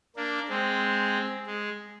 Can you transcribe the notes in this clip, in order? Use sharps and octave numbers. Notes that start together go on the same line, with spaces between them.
A#3 D4
G#3 C4
G#3